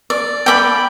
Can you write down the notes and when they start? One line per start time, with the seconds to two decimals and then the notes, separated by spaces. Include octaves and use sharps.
0.10 D5
0.46 G5 B5 D6